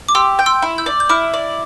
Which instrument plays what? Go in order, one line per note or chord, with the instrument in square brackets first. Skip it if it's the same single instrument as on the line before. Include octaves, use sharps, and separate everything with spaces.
[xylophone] D6
[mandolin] G4 [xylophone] C6 E6
[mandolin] G5
[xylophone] C6 E6
[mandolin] E4
[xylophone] E6 G6
[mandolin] D5
[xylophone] G6
[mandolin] E4 [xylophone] D6 F6
[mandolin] D5